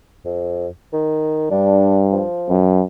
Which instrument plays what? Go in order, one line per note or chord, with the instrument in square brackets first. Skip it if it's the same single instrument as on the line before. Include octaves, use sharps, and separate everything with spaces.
[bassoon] F2
D#3
[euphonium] G2 [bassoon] D4
[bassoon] F3
[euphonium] F#2